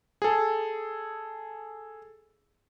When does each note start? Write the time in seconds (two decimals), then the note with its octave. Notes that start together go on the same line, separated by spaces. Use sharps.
0.22 G#4 A4